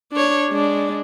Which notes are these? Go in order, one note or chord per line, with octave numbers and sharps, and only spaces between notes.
D4 C#5
G#3 D4